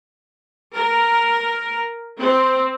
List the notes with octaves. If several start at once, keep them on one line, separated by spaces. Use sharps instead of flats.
A#4
C4